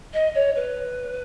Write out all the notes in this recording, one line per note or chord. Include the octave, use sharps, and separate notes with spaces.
D#5
C#5
B4